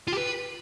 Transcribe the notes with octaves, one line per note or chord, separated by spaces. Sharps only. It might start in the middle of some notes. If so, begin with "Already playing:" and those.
F4
G4
B4